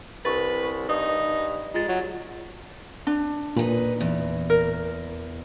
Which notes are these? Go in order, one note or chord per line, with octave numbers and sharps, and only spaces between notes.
C2 B4 C#6 A6
G2 D#4 D#6
G#3 F4 A6
F#3
D4
A#2 D#4 B4
E2
A#4